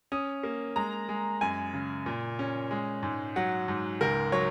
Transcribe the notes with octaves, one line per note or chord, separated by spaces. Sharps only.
C#4 D#6
A#3
G#3 A#5
G#3
F#2 G#5
C#3
A#2
C#4
G#3
G#2
F#3 F#5
G#2
C#2 A#4
F#3 C#5